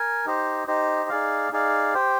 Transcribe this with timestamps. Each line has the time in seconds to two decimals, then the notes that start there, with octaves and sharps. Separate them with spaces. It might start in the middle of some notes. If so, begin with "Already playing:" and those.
Already playing: A#4 G#5
0.25 D#4 G4 C5 D#5
0.67 D#4 G4 C5 D#5
1.09 D#4 G#4 D5 F5
1.52 D#4 G#4 D5 F5
1.94 G4 C5 G5